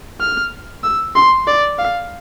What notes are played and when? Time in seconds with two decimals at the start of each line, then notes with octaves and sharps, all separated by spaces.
0.21 F6
0.83 E6
1.15 C6
1.47 D5
1.78 F5